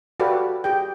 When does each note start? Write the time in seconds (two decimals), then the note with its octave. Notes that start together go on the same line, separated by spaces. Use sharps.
0.20 F#4 G4 A4 B4 D5 F5
0.64 G4 G#4 G5